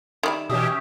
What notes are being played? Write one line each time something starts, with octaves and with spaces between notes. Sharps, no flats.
D#3 G3 E4
B2 E3 C#4 G4 E5 D#6 E6